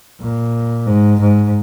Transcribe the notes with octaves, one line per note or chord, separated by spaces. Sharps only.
A#2
G#2
G#2